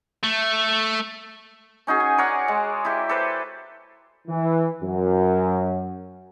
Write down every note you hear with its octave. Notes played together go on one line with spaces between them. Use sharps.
A3
C#4 D#4 F#4 G#4
G#5
A#4 C#5 D5 F#5
G#3
E4 G4
A4 B4 C5
E3
F#2